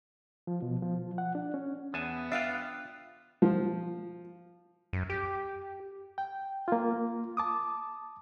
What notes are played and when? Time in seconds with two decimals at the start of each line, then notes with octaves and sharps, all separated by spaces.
0.47 F3
0.62 B2
0.83 F3
1.18 F#5
1.35 D4
1.54 C#4
1.94 E2 B3 G#5 A5
2.32 D4 F4 E5 F5 G5
3.42 F3
4.93 F#2
5.10 G4
6.18 G5
6.68 A#3 F4
7.37 A5 D6 D#6